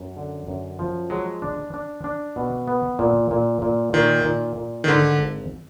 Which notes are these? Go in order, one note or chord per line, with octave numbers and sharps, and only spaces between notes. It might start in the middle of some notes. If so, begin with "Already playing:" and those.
Already playing: F#2
D3
F#2
F3
F#3 G#3
D4
D4
D4
B2
B3
A#2
A#2
A#2
A#2 D#3
A#2
A#2
D#3
G#2 D3
G#1